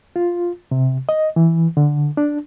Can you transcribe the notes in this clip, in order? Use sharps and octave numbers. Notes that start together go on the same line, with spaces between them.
F4
C3
D#5
E3
D3
D4